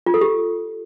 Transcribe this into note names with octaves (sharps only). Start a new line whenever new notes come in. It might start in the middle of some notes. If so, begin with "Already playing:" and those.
F4
A4
G4